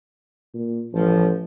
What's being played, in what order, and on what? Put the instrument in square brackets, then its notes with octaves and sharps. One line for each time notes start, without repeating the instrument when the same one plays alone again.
[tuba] A#2
[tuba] A1 [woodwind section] F3